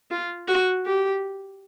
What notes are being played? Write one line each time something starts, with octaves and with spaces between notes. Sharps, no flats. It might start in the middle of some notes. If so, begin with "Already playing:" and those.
F4
F#4
G4